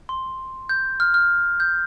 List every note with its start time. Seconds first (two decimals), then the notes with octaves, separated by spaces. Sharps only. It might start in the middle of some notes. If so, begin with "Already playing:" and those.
0.09 C6
0.69 G6
1.00 F6
1.14 F6
1.60 G6